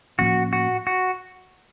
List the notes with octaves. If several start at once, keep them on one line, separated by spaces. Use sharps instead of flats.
A2 F3 A#3 C#4 F#4
F#4
F#4